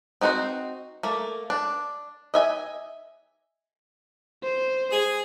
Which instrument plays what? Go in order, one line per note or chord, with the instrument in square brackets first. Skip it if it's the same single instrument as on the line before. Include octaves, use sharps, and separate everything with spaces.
[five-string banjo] C4 D#4 F#4 A4 C5
A3 A#3
D4
D#5 E5 G#5
[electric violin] C5
[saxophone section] G#4